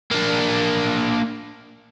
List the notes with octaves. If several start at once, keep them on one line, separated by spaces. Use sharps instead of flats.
A#3 D4